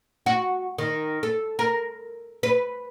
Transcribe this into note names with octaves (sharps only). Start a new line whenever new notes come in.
F#4
D#3
A4
A#4
B4